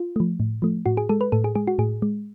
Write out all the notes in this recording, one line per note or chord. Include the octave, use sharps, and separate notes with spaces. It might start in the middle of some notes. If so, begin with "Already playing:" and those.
Already playing: F4
F3 A3
A2
F3 A3
A2 F#4
G#4
G#3 A4
B4
A2 A4
G#4
G#3 G#4
F#4
A2 G#4
G#3